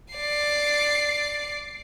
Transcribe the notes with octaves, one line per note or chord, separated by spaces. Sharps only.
D5 C7